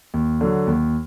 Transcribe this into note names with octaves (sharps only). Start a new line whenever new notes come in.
D#2
D3 F#3
D#2